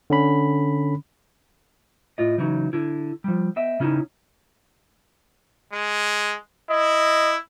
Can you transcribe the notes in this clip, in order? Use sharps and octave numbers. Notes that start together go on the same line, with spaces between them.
D3 C#4 B5
A2 F4 D#5
C#3 E3 F#3 C#4 D#4
D3 E4
F3 G3
B3 D#5 E5 G5
C#3 C#4 D#4 E4
G#3
E4 D#5